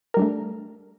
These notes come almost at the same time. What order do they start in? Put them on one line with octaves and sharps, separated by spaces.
A#4 G3 D4 A3